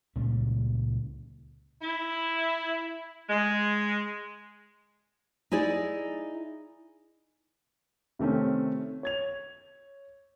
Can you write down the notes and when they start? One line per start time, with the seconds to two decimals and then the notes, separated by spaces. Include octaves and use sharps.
0.16 C#2 A#2 G3 C#4
1.82 E4
3.30 G#3
5.52 D#4 E4 G#4 D5
8.19 C3 D#3 A3 C4 C#4
9.03 C#5 G#6 F7